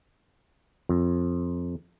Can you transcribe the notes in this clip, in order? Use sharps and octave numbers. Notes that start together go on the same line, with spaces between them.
F2